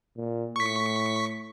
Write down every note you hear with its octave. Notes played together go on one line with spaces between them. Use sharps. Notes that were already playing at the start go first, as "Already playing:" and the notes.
A#2
A2 C#6 B6